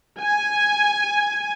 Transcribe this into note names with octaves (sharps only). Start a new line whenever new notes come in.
G#5